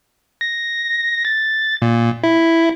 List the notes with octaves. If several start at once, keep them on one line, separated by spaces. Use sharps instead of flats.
A#6
A6
A#2
E4